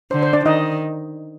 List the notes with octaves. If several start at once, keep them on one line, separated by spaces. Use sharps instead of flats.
D3 C5
C5
D4 D5
D#3 D#4 D#5